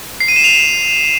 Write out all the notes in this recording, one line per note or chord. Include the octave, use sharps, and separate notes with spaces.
C7
D#7
E7
F7